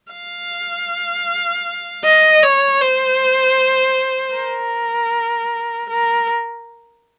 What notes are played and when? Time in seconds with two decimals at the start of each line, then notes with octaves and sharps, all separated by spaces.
0.12 F5
2.05 D#5
2.43 C#5
2.81 C5
4.35 A#4
5.89 A#4